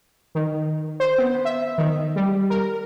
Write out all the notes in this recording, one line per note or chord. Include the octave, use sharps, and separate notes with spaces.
D#3
C5
B3
E5
D#3
G3
A#4